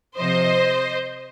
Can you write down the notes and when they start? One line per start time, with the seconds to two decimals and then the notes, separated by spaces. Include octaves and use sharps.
0.17 C3 F3 C5 D#5